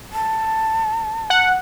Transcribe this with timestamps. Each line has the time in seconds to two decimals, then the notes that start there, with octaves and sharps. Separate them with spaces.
0.13 A5
1.30 F#5